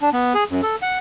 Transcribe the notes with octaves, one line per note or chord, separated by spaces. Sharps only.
D4
B3
G#4
F#2
A4
F#5